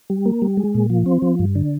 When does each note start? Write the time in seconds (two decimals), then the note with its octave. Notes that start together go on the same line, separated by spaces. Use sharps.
0.10 G3
0.25 A#3
0.42 G3
0.57 G#3
0.75 A#2
0.90 F3
1.06 C4
1.22 F3
1.39 G2
1.55 D3